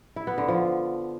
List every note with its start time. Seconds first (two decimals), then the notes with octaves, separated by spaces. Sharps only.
0.16 E4
0.27 B3
0.38 D3
0.48 F3